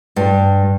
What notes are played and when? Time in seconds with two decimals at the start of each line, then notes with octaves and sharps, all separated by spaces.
0.16 G2